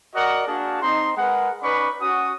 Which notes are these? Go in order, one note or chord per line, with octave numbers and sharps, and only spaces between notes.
F#4 A#4 D5 D#5 F#5
A#3 D4 F#4 G#4 F5 A5
C4 D#4 C6
G#3 A#4 B4 F#5
C#4 D#4 B4 D5 B5 C#6
C#4 F#4 D#6